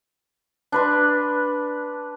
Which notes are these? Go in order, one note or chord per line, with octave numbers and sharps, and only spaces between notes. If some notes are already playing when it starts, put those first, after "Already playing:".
D4 B4 C6